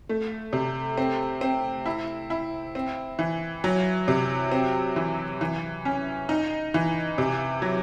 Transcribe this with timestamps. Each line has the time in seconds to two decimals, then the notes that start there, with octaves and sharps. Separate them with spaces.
0.09 A3
0.53 C3
0.98 C4
1.41 C4
1.86 E4
2.30 E4
2.75 C4
3.19 E3
3.64 F#3
4.08 C3
4.52 C4
4.96 E3
5.41 E3
5.85 C#4
6.29 D#4
6.74 E3
7.18 C3
7.62 F#3